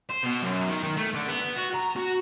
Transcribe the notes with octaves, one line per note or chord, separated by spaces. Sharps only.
C5
B2
F#2
D#3
D#3
A3
D3
B3
F#4
A#5
F#4